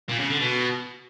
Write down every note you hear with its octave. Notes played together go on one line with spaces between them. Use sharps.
A#2
C#3
D3
B2